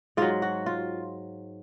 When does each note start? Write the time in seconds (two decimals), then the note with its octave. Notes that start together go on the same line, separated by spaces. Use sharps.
0.17 G#2 F#3 F4
0.42 F#4
0.66 F4